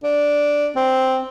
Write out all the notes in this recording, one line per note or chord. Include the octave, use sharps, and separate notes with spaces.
D4
C4